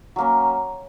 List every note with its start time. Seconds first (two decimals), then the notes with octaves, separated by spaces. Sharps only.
0.16 F#3 A#3 C#4